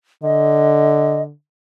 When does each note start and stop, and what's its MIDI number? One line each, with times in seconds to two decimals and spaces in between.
0.23 1.32 50
0.23 1.22 75